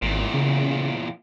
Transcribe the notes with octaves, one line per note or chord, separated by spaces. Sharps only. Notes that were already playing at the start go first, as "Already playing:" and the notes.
G#1 E2 A#2
C#3